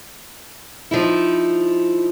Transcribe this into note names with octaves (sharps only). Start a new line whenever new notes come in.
F3 D#4 E4